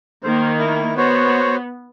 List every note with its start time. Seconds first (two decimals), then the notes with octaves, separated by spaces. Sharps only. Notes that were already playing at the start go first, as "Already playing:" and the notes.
0.23 D#3 A#3 C5
0.58 E4
0.97 B3 F#4 C5 C#5